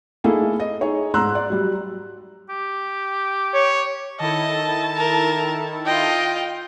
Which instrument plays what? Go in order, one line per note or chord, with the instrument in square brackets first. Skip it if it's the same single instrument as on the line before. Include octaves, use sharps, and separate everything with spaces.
[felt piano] A3 A#3 D#4 E4 G#4 A4
D#5
D#4 G#4 C#5
G#2 A#5 C6 E6 F#6
D5
F#3 G3
[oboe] G4
[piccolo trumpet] C#5
[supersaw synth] D#3 E4 A4 [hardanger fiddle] D#5 [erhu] A5
[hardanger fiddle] A#4
[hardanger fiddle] F4 D#5 [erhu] G5